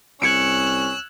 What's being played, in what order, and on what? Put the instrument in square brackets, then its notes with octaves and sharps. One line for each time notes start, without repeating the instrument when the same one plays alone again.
[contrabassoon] C2 [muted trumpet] C#4 [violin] E6 F#6 [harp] G#6 C#7 D7